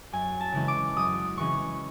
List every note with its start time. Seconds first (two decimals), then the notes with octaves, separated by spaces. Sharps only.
0.13 F#2 G#5
0.40 A5
0.52 C#3 E3 G#3 C#4
0.68 D6
0.96 F#2 D#6
1.37 C#3 E3 G#3 C#4 C#6